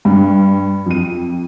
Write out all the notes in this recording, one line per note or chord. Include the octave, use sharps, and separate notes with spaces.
G2
F2 D#7